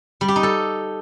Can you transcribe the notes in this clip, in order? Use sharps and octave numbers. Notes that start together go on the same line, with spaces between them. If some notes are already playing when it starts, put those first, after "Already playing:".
G3
G4
D#4
A4